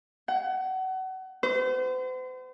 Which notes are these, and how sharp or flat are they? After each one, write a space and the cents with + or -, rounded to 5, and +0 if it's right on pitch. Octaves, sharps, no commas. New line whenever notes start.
F#5 +30
C5 -40